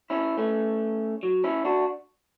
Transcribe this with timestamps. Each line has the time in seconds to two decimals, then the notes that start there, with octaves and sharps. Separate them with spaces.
0.10 C#4 E4
0.38 A3 C#4
1.23 F#3
1.44 C#4 E4
1.65 D4 F#4